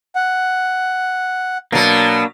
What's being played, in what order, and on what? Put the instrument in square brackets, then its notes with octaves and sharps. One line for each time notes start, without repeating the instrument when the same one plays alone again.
[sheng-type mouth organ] F#5
[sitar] B2 F#3 [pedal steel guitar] A#3 D4